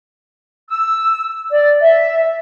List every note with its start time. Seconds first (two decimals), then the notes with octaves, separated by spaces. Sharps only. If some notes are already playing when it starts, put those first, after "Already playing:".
0.69 E6
1.51 D5
1.81 E5